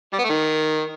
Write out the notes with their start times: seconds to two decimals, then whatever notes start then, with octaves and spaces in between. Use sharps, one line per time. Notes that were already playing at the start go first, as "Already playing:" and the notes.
0.13 G3
0.18 B3
0.24 A3
0.30 D#3